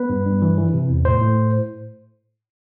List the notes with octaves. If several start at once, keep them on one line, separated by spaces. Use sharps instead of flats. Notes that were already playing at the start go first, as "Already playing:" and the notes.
Already playing: B3 B4
G2
G2
E3
E3
C3
E2
A2 C5
A2